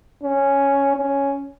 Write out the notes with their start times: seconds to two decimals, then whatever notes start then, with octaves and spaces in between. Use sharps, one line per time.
0.23 C#4
0.97 C#4